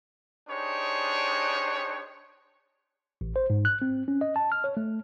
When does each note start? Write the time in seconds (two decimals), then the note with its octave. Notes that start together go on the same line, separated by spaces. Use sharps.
0.49 D4 D#4 G4 G#4 C5 C#5
3.21 A1
3.36 C5
3.50 G#2
3.65 F#6
3.82 C4
4.08 C#4
4.21 D#5
4.36 A5
4.52 F6
4.64 C#5
4.77 A3